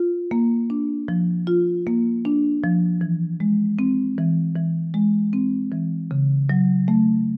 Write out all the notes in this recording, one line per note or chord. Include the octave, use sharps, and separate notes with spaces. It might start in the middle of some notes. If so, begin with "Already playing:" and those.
Already playing: F4
A#3
D4
F3
F4
A#3
D4
F3
E3
G#3
C4
E3
E3
G#3
C4
E3
C#3
F#3
A3